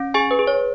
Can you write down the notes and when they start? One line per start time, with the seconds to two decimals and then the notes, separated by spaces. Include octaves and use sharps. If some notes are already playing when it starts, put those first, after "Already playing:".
Already playing: C#4
0.14 G#4 G#5 C#6
0.31 B4
0.39 G#4
0.47 C#5